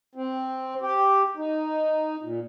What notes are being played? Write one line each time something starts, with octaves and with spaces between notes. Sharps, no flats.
C4
G4
D#4
A#2